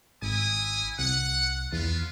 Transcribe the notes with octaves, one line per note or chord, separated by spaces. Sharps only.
G#1 E4 G#5 D#6
C2 F#5
E2 B3 F4